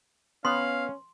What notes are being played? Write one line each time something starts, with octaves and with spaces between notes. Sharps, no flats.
B3 C#4 F5 C6